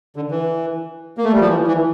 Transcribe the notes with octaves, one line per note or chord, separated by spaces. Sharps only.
D3
E3
A#3
A3
G3
F3
E3
E3